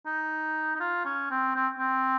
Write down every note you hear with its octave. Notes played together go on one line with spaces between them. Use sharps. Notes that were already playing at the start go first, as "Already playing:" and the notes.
D#4
D#4
F4
C#4
C4
C4
C4